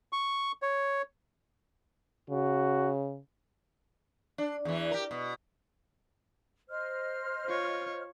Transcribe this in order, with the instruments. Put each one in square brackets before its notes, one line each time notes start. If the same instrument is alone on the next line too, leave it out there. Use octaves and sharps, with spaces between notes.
[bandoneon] C#6
C#5
[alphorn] C#3 [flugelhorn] F#4
[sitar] D4
E2 E3
G4 A#4
B2
[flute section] C5 D#5 F6
[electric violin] F4 C#5